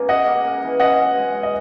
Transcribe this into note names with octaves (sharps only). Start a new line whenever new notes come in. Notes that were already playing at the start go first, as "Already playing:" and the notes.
Already playing: B2 A#3 C#4
C#3 D#5 F#5
A#3
A#3
E3
C#4 D#5 F#5
B2
G#3
C#4
D#5